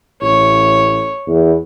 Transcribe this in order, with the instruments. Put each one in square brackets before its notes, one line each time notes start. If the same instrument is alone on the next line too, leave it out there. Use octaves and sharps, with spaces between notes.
[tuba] A1 [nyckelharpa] C#5
[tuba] E2